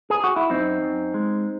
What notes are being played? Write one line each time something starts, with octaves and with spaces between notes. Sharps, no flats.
G#4
F#4
E4
F#2 C4 D#4
F#2
G#3